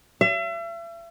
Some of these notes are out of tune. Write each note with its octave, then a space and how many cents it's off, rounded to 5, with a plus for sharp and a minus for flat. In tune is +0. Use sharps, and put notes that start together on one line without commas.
E5 +40